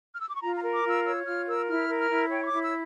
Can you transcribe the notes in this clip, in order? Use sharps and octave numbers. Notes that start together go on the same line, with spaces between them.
F6
E6
D6
C#6
F4 A#5
A#5
A#4
D6
F4
E6
C#5 E6
F4 F6
A#4 E6
E4 F6
A#4
F6
E4
C#5 G5
C#6
D6
E4
E6